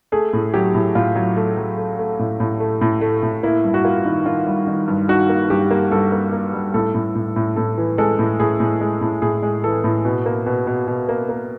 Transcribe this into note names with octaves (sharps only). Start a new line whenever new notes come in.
A3 G#4
A2
F#3 G4
A2
A2 F4
F#3
A3
F#3
A3
A3
A2
A2
A3
A2
A3
A2
A#3 E4
G2
F#4
A#3 F4
D#3
D#3 F4
G3
D#3
G2
D#3 F#4
A#3
G2 G4
A#3
G2 A4
A#3
A#3
G3
A2 A4
A2
A2
A2
A2 A4
E3
G#3 A4
A2
A2 G#4
A2
G#3
A2
A2 G#4
G#3
E3 A4
A2
B2
A#3
B2
B2
B2
A#3
A#3